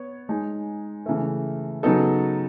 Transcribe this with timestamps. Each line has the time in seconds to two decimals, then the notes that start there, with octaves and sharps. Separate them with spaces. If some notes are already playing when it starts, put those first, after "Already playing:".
Already playing: B3 C#5
0.29 G#3 D#4 G#4
1.06 C#3 E3 A3
1.83 C#3 F#3 B3 D#4 A4